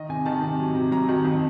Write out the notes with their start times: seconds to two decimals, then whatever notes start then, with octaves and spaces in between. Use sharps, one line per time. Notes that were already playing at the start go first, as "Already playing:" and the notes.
Already playing: D#3 D#5
0.09 C3 G#5
0.26 D#3 A5
0.43 C3
0.59 F#3
0.75 C3
0.92 F#3 A#5
1.09 D#3
1.25 F2